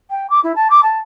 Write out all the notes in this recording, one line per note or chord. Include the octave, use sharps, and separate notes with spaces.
G5
D6
E4
A5
D6
A5